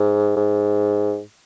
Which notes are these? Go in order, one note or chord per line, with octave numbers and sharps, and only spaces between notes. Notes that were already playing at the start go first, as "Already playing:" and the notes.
Already playing: G#2
G#2